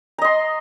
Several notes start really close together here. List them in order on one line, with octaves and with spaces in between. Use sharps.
A#5 D#5 C6